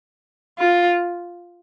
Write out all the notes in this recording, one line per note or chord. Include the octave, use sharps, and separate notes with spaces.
F4